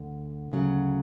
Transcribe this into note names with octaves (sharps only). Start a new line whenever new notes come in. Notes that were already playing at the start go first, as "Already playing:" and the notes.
Already playing: D2 D3
D2 C#3 F#3